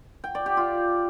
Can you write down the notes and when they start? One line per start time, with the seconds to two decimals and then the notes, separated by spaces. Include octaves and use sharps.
0.24 G5
0.35 D5
0.46 G4
0.57 F4